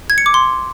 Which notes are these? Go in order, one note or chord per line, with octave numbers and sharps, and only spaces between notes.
G#6
C#7
D6
C6